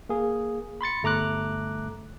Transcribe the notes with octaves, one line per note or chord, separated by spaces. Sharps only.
A#3 G#4
B5 C6 A6 C#7
G1 A3 A#5 D6 F#6